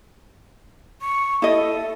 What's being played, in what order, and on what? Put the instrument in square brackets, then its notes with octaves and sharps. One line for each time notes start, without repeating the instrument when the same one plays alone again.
[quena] C#6
[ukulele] E4 D#5 [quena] A4